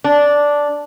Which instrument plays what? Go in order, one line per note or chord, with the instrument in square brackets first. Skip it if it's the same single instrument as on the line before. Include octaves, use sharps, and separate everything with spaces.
[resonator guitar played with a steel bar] D4